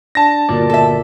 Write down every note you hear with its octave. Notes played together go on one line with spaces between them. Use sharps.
D4 D5 A5 A#6
G1 A#2 F4 F#4 A#4 D5
A4 E5